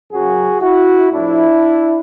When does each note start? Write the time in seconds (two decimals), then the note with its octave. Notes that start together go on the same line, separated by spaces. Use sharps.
0.11 F#2 C#3 F#3 F#4 G#4
0.62 E4 F#4
1.11 A2 F3 D4 E4